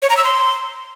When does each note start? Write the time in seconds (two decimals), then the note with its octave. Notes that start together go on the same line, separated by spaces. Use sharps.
0.02 C#5
0.10 A#5
0.17 E6
0.24 C6